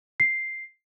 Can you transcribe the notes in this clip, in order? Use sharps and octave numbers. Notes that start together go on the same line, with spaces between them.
C7